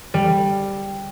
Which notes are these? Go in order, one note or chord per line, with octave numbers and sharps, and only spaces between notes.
G3